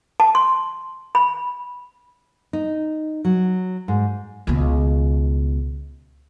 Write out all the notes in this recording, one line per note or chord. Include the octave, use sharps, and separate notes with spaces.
A5
C6
B5
D#4
F#3
G#2
C#2 B2